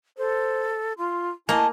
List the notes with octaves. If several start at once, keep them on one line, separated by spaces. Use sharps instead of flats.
A4 C5
F4 C6
A3 A#3 E4 D#5 G#5 A5